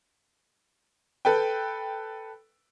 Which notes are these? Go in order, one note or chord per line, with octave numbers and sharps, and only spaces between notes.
A4 B4 G5